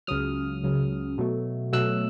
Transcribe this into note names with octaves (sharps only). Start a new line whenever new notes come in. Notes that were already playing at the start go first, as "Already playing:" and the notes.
C#2 C#3 F#3 D#6 F6
C#2 C#3 F#3
B2 F#3 A3
B2 F#3 A3 E6 F#6